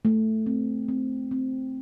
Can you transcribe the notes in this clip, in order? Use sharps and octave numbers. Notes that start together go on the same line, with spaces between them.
A3
C4
C4
C4